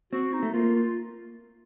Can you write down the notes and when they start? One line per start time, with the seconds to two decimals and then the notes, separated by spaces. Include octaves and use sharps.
0.13 C4 F#4
0.33 D#4
0.43 A3
0.54 A#3 F4
0.76 F4